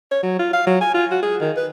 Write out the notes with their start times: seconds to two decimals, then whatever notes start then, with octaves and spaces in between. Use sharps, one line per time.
0.12 C#5
0.23 F#3
0.39 F4
0.53 F5
0.67 F#3
0.81 G#5
0.94 F4
1.11 F#4
1.23 G#4
1.41 D#3
1.57 B4